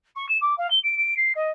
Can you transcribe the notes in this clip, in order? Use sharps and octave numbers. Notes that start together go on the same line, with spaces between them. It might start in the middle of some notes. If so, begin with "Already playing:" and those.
C#6
E7
D6
F5
G7
D7
D7
C7
D#5